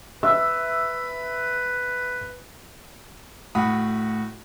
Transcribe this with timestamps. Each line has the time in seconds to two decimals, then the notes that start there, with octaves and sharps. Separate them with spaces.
0.23 B4 E5 E6
3.55 A2 F#4 F#5 B5 D#6